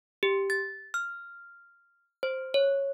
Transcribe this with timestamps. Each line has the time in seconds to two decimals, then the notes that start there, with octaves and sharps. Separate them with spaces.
0.23 G4
0.50 A6
0.94 F6
2.23 C5
2.54 C#5